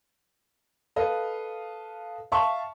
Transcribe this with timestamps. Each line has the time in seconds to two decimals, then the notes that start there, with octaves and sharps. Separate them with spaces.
0.96 A4 B4 D#5 F5
2.32 E5 F5 A5 C#6